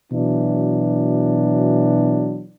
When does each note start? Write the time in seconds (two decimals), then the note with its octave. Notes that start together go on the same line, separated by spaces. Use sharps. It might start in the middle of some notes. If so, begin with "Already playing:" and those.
0.12 B2 E3 F#3 D4